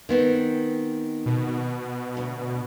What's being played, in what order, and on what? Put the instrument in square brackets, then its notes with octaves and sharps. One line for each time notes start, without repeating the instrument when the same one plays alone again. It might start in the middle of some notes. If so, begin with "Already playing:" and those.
[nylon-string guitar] D#3 B3 C4
[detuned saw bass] B2
[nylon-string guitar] D2